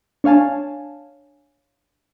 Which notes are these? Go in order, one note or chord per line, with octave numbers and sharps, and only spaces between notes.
D4 C#5 F5 G#5 A5